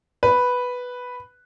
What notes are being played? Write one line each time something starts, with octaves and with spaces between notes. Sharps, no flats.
B4